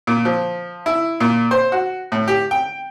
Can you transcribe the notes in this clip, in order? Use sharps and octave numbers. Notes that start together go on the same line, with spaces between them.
A#2
F3
E4
A#2
C5
F#4
A2
G4
G5